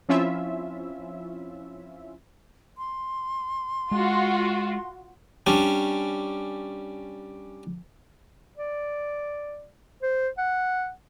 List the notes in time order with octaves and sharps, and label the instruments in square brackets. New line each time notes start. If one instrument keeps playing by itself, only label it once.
[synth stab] F3 C4 C#4 E4 F4 E5
[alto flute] C6
[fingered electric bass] G#3 [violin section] F4 F#4
[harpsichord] G3 C#4 D4
[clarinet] D5
C5
F#5